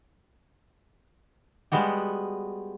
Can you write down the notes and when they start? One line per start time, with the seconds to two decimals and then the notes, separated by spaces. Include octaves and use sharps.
1.72 G3 G#3 B3 F#4 G4